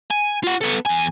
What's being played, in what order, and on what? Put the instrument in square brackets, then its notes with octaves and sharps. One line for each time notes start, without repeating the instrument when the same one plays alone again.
[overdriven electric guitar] G#5
F4 F#5
B3 A4
E2 G#5